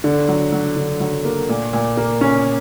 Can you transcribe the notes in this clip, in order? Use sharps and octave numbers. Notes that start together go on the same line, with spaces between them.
D3
F#3
F#3
D3
F#3
A#3
A#2
A#2
A#3
C#4